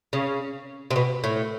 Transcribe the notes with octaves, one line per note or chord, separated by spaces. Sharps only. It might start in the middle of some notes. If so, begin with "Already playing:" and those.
C#3
C3
B2
A2